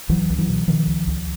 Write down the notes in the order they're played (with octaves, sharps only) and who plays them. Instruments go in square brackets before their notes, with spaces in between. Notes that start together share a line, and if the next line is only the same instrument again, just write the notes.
[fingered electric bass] C#2 E3 F#3
C#2
E3 F#3
B2
B2 D#3 F3
C#2
C#2